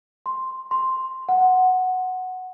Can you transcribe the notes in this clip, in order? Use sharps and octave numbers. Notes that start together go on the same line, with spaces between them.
C6
C6
F#5